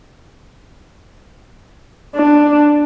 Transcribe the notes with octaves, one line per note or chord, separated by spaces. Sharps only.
D4